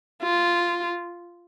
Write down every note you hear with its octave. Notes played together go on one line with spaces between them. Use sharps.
F4